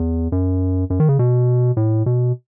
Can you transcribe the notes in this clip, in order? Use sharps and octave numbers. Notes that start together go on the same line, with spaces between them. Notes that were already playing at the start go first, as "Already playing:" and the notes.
Already playing: E2
F#2
F#2
D#3
C#3
B2
A2
B2